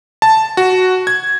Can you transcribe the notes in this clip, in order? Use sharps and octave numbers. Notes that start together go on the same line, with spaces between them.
A5
F#4
G#6